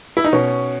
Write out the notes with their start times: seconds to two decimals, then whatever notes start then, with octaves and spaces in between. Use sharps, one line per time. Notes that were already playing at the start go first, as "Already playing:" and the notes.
0.17 E4
0.24 D#4
0.33 B2 C#4